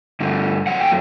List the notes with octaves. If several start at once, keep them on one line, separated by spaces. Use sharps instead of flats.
G2 D3 A3
F#2 F#3 A3 F#5
G5